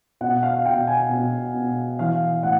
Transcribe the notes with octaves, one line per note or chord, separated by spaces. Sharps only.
B2 F#5
F5
B2 G5
G#5
B2
B2
E3 F5
A2 F#5